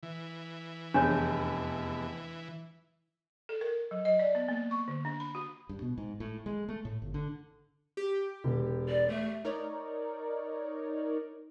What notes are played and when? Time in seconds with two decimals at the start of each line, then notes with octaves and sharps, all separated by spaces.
0.03 E3
0.94 F1 E2 D4 C#5
3.49 A4
3.61 A#4
3.91 F#3
4.05 D#5
4.19 D5
4.35 B3
4.48 A#3
4.71 C#6
4.88 D3
5.05 D4
5.20 B5
5.35 F#4
5.69 G2
5.82 B2
5.98 G#2
6.20 A2
6.46 G#3
6.69 A3
6.85 A2
7.02 G1
7.14 D3
7.97 G4
8.44 E1
8.89 D5
9.08 A3
9.45 D#4 A#4 C#5 D5